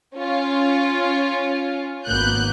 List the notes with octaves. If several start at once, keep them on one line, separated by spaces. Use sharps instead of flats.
C#4 F4
G#1 A#3 B3 F#6 G6